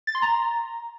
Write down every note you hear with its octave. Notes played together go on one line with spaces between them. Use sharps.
A6
C6
A#5